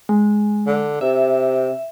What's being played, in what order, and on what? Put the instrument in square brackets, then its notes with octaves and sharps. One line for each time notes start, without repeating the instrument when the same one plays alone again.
[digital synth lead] G#3
[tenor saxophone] D3
[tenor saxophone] C3 [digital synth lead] E5